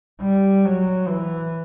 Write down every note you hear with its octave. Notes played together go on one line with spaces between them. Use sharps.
G3
F#3
E3